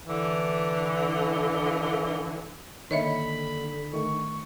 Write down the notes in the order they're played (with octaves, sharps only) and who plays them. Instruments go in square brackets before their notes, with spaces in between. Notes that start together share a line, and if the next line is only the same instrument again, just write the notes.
[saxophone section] D3 E3
[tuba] D3 [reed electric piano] D#3 A#3 [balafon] C#5 D#5 E5 [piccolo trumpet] B5
[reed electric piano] D#3 A3 [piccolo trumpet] C#6